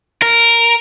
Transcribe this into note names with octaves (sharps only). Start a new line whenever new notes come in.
A#4